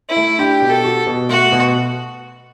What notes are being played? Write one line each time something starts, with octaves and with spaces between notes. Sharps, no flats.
E4
A3
D4 G4
B2
A4
F#4
B2
A3 F#4
B2